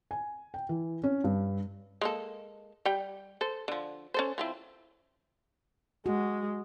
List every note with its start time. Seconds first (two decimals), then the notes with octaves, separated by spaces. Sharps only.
0.11 G#5
0.54 G5
0.69 E3
1.04 C#4
1.24 G2
2.01 G#3 A#3 A4
2.85 G3 G5
3.41 A4 C5
3.68 D3 F3
4.14 C#4 A4 C5
4.38 F3 C4 E4
6.06 G#3 F#4